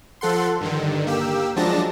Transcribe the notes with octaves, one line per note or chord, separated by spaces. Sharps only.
F3 A4 F#5 C6
G2 D3 D#3
A#3 G4 E6
F3 F#3 G#3 D4 A5 A#6